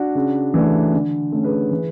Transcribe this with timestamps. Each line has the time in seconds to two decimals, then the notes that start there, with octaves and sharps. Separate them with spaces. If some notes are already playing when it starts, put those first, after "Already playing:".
Already playing: D4 F#4
0.15 C#3
0.54 E3 A3 D4
0.94 D3
1.32 A3 C#4
1.44 G#4 B4
1.71 E3